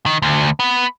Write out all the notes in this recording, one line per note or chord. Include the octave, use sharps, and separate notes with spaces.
D#3
D2
B3